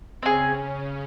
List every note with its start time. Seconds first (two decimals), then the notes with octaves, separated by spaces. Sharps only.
0.23 C#3 C4 C#4 F4 G#4